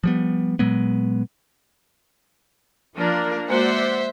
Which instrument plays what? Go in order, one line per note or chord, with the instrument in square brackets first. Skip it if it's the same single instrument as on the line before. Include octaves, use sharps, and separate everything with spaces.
[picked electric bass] F3 G3 B3
A#2 F#3 G#3 B3
[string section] F3 [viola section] A#3 D4 A#4
[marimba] G#3 A#3 F#4 [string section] C5 E5 [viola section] D5 F#5